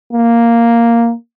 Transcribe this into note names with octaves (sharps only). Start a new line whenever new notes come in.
A#3